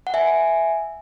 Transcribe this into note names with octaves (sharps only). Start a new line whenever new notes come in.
F#5
E5 G#5